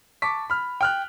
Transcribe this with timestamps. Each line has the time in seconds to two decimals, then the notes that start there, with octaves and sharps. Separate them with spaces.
0.22 A5 C#6 D6 B6
0.50 B5 F6
0.81 G5 F6 F#6